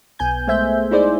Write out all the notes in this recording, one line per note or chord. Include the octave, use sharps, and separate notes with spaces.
B1 B3 G#5 G6
G#3 A3 C5 E5 G6
D#4 E4 G#4 C5 D5